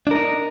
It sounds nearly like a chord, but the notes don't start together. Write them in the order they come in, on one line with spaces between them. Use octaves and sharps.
D4 A#4 D#4